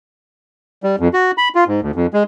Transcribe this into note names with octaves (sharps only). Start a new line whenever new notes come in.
G3
F2
F#4
B5
F4
G#2
D2
F2
G#3